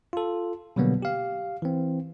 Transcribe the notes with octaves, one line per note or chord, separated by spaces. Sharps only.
F4 A4
B2 D3 F#3 G3 A#3 B3
G4 F5
E3 C4